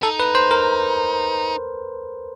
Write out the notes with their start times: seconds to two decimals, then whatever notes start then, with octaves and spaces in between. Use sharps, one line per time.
0.03 D#4 A4
0.20 B4
0.35 C5
0.51 A#4